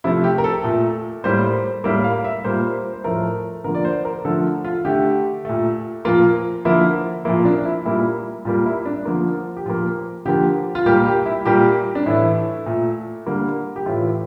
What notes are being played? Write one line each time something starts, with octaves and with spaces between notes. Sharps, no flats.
C3 F3 A3 E4
G4
A#4
A4
A#2 A3
A2 G3 A#3 C5
A2 G3 A#3 E5
F5
E5
A#2 G3 A#3 C5
C5
A2 F3 A3 A#4
D3 F3 A#3 A#4
D5
C5
A#4
D3 F3 A3 A4
F4
D3 A3 G4
A#2 A3
A#2 F3 A#3 F4
D3 F3 A#3 E4
A#2 F3 A#3 E4
D4
E4
A#2 G3 A#3 E4
A#2 G3 A#3 F4
E4
D4
D3 F3 A#3
G4
A#2 F3 A#3 F4
D3 F3 A#3 G4
F4
A#2 G3 A#3 G4
G4
E4
A#2 G3 A#3 G4
D4
A2 E3 A3 E4
A#2 A3
D3 G3 A#3
G4
A2 E3 A3 F4